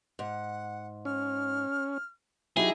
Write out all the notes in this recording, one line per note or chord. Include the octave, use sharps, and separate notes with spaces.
G#2 F#5
C#4 F6
F#3 D#4 E4 G4 G#4 G#5